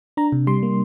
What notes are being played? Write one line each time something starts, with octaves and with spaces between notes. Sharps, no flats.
D4 A#5
C3
G3 C6
A#3